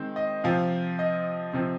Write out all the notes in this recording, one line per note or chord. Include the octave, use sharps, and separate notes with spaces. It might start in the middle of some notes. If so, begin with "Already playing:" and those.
Already playing: D#3 G#3 C4
D#5
C3 F3 C4 F5
D#5
C3 F3 C4